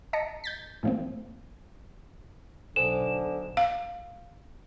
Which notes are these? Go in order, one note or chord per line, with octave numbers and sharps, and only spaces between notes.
D#5 A5 A#5 A#6 C#7
G6 A6 B6
A2 E3 F3 A#3 C4
B1 D3 A4 C5 G#5 E7
F5